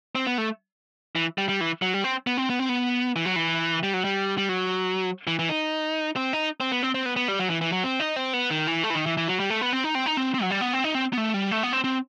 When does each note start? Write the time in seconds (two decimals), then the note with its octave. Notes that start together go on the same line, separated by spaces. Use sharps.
0.15 C4
0.27 B3
0.38 A3
1.16 E3
1.38 G3
1.49 G3
1.61 E3
1.82 F#3
1.94 G3
2.04 C4
2.27 B3
2.38 C4
2.50 B3
2.59 C4
2.69 B3
3.16 E3
3.25 F#3
3.36 E3
3.83 G3
3.94 F#3
4.04 G3
4.38 G3
4.49 F#3
5.27 E3
5.39 E3
5.49 D#4
6.16 C4
6.33 D#4
6.60 C4
6.72 B3
6.83 C4
6.94 C4
7.06 B3
7.16 B3
7.28 G3
7.39 F#3
7.50 E3
7.61 E3
7.72 F#3
7.84 C4
8.00 D#4
8.16 C4
8.33 B3
8.50 D#3
8.67 E3
8.84 A3
8.90 E3
8.95 D#3
9.06 E3
9.17 E3
9.28 F#3
9.40 G3
9.50 A3
9.61 B3
9.73 C4
9.84 D#4
9.95 C4
10.06 D#4
10.17 C4
10.34 C4
10.42 F#3
10.51 G3
10.61 B3
10.73 C4
10.84 D#4
10.94 C4
11.13 B3
11.18 A3
11.34 G3
11.51 A3
11.63 B3
11.73 C4
11.84 C4